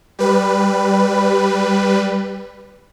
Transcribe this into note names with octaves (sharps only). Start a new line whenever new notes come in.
G3 B4